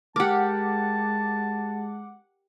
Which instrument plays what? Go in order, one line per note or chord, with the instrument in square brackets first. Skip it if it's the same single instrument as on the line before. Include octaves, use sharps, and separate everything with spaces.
[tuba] G#3 [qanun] G4 A#4 [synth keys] F#5 D6 [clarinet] A5